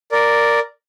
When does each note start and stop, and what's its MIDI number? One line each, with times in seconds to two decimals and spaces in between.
0.12 0.60 70
0.12 0.60 74